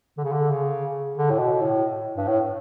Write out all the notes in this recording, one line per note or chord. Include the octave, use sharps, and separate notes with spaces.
D3
C#3
D3
C#3
D3
A2
B2
A2
G2
A2